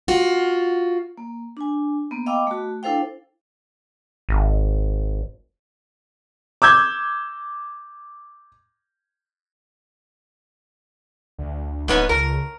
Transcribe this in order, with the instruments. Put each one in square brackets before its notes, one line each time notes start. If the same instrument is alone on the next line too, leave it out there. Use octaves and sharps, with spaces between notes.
[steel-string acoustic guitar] F4 F#4
[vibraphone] A#3
D4 G#5
A#3 B3
D#5 F5 G5 B5 D6 E6
A3 F#4
D4 E4 A4 C5 F5 G5
[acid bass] G#1
[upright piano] D6 E6 G6 G#6
[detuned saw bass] D2
[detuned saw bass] D1 [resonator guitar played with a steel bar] G#2 B3 C#4
[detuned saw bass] C#2 [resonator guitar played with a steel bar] A#4